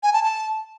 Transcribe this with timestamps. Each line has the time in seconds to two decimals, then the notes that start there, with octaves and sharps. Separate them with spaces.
0.03 G#5
0.13 A5
0.23 A5